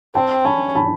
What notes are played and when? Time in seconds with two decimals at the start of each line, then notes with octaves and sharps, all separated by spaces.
0.15 C4 G5 A5
0.45 C#4 A5 B5
0.75 A5 B5